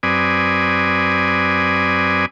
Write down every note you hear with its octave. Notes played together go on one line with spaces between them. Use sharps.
F#2 C4 B4 D5 G#5 D#6